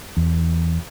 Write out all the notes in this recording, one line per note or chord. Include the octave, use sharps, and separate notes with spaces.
E2